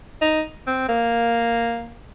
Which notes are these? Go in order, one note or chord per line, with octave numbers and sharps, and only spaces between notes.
D#4
C4
A#3